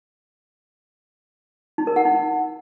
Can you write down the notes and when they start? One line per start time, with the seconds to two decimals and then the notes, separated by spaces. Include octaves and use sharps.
1.78 D#4
1.87 A#4
1.96 F#5
2.05 D#4